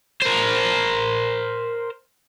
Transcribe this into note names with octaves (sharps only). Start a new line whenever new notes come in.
A#4 C5